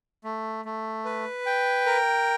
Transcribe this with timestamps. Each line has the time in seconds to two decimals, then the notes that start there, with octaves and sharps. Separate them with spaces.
0.24 A3
0.65 A3
1.05 B4
1.46 G5
1.86 A#4